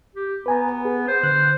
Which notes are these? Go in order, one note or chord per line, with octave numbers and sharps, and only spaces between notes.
G4
B3 B4 G#5 A#5
G#4 B4
C5
D3 F#6